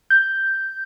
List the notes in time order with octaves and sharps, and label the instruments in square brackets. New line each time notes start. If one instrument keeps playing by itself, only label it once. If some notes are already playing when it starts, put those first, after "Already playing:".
[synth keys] G6